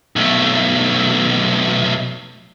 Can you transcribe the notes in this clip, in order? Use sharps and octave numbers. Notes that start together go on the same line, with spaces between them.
B1 A3